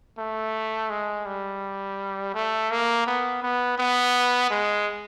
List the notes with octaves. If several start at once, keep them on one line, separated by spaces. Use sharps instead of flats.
A3
G#3
G3
A3
A#3
B3
B3
B3
G#3